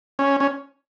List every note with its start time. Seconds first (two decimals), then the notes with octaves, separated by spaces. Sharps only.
0.19 C#4
0.40 C#4